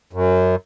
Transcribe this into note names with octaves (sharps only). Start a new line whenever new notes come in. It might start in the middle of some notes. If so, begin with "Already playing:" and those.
F#2